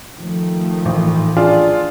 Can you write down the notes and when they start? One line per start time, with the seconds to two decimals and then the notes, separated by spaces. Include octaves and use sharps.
0.16 D#3 F3 A3
0.85 G#1 A2 E3
1.37 D4 F4 G#4